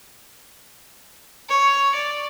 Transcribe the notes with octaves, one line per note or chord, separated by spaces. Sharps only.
C#5
D5